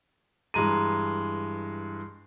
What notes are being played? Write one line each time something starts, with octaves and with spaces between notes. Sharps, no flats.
G2 E3 G#3 A#5 D#7